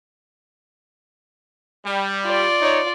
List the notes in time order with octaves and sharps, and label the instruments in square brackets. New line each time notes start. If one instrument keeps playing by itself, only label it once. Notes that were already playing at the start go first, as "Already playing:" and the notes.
[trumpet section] G3
[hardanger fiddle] F4 D5
[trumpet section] D#4 C#5